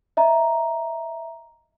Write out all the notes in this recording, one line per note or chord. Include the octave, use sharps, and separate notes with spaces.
D#5 E5 A#5